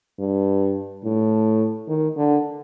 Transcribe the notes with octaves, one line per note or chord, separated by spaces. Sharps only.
G2
A2
D#3
D3